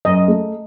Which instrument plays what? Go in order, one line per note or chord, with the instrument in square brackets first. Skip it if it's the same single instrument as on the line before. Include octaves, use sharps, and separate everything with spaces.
[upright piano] F#2 [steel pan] D#5
[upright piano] A3